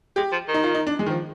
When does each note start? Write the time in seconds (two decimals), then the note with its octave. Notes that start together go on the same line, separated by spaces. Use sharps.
0.16 G#3 G4
0.32 F3
0.48 D#3
0.54 D#4
0.64 F4
0.75 D#4
0.87 D4
0.99 G#3
1.06 D#3
1.10 F3